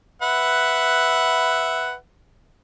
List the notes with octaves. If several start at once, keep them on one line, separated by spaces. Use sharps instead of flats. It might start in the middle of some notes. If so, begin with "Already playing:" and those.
B4 E5 F#5